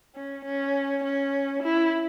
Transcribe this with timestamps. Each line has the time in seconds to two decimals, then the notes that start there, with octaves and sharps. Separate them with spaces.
0.15 C#4
0.45 C#4
1.04 C#4
1.63 E4